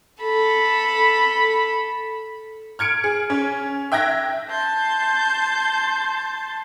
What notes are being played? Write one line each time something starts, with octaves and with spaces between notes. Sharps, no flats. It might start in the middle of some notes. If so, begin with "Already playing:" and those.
A4 B5
F6 G#6 C#7 D7
G#4
C#4
E5 G5 F#6 G#6 A#6
A5 C6 G6